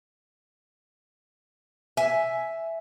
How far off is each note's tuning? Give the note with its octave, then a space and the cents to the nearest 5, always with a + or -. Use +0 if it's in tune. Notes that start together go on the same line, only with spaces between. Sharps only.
E5 +0 G#5 +10